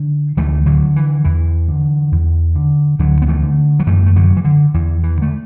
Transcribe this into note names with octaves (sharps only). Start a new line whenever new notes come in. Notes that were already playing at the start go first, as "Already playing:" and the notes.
Already playing: D3
D2 E3 A3
D3 F#3
D3
E3
E2 E3
D3
E2
D3
D2 D3 F#3
B3
E3 A3
D3
F#3
F#2 E3 A3
A3
D3 F#3
D3
E3
D3
E2 E3
E3
D3 A3